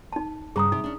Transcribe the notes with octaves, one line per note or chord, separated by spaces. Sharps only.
D#4 A5
G2 C#3 G#4 A#5 D#6
C3 D#4
C#4 D4